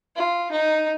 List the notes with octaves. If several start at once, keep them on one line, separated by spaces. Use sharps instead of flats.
F4
D#4